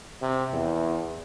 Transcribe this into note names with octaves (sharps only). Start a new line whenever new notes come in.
C3
E2